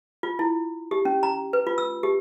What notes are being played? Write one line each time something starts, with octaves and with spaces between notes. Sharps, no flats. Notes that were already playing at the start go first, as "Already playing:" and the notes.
F4
E4
G4
C#4
A#5
B4
F4
E6
G4